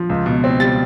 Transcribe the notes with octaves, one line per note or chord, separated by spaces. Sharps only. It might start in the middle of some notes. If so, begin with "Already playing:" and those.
Already playing: F3
C#2
B2
C4
G3 A6